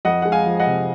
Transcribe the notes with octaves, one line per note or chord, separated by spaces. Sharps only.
F2 D#5 F#5
G#3 F#5
F5 G#5
F3
D#5 F#5
C3